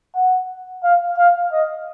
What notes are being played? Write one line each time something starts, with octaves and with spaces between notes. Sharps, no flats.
F#5
F5
F5
D#5